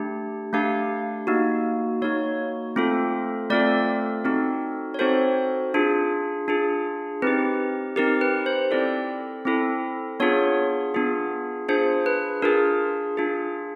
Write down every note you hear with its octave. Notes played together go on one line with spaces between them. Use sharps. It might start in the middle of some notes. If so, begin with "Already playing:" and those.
Already playing: A3 D4 G4
A3 D4 G4 F5
A#3 D#4 F#4
A#3 D#4 F#4 C#5
A3 C4 F4 A4
A3 C4 F4 A4 D5
C4 D#4 F#4 A4
C#5
C4 D#4 F#4 A4 C5
D4 F4 G#4
D4 F4 G#4
C4 D#4 G4 B4
C4 D#4 G4 A#4
B4
C5
C4 E4 A4 D5
C4 E4 A4
B3 D4 F4 G#4 C#5
B3 D4 F4 G#4
D4 F4 G#4 C5
B4
D4 F4 G#4 A#4
D4 F4 G#4